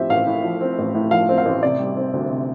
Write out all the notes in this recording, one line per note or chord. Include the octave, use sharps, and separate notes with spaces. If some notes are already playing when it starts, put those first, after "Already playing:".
Already playing: A2 F3 C4 G4 E5
A1 F5
A2
F3
C4
A1
A2
F3 F5
C4
F5
A1
C3 D5
G3
C4
D2
C3